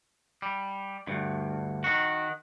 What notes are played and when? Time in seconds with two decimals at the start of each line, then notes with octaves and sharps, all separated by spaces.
0.42 G3
1.07 D2 G2
1.84 D#3 F#4